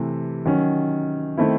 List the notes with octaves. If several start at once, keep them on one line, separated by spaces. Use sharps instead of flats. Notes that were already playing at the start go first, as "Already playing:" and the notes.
Already playing: C3 E3 A3
D#3 F#3 C#4
D#3 A3 C4 E4